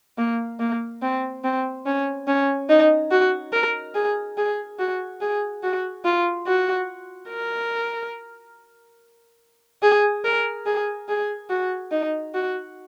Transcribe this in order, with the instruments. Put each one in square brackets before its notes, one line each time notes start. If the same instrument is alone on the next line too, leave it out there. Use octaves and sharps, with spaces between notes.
[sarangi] A#3
A#3
C4
C4
C#4
C#4
D#4
F#4
A#4
G#4
G#4
F#4
G#4
F#4
F4
F#4
A#4
G#4
A#4
G#4
G#4
F#4
D#4
F#4